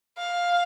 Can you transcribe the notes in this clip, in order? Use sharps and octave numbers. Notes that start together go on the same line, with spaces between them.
F5